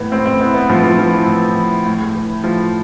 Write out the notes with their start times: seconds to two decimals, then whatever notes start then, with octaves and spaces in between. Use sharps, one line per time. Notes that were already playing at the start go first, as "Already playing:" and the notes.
Already playing: A2 E3 B3
0.12 A2 C4
0.26 C4
0.40 E3 B3
0.54 B3
0.69 A2 F3
0.83 F3
0.99 E3 F3
1.13 E3
1.27 A2
1.57 E3
1.86 A2
2.15 E3
2.44 A2 F3